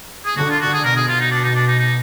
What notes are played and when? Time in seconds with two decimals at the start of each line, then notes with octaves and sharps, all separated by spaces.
0.25 G#4
0.37 D3 F#4
0.50 F4
0.60 F#4
0.73 G#4
0.84 B2 A#4
0.96 G#4
1.08 F4
1.20 D#4
1.31 D4
1.44 D#4
1.55 D4
1.67 D#4
1.79 D#4